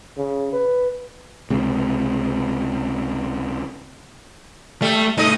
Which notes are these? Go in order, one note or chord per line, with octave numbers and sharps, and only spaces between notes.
C#3
B4
C#2 C3
G3 A3
G2 A3 D#4 D#5